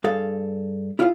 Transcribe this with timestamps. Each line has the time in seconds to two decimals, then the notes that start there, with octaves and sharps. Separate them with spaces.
0.04 G2 G#4 A4 F5
0.99 E4 F4 G#4 C#5 F5